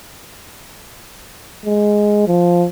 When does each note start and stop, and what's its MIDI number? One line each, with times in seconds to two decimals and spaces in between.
1.65 2.25 56
2.27 2.66 53